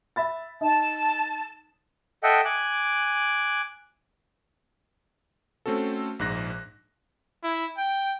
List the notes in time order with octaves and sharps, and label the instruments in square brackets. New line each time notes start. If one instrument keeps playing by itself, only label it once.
[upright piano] E5 B5 A6
[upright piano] D#4 [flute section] A5
[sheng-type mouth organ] A4 D#5 E5 F#5 G5
G#5 D6 F#6
[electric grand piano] A3 C4 C#4 F#4 A4
A#1 G#2 F#6 A#6
[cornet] E4
G5